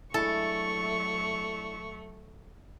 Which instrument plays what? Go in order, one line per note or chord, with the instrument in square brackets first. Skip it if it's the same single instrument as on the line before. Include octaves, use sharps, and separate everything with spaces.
[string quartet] F#3 A3 [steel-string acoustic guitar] G#3 D4 E4 [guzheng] A4 [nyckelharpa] C#6